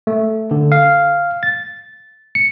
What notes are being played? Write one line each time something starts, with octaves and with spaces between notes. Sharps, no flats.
A3
D3
F5
A6
C#7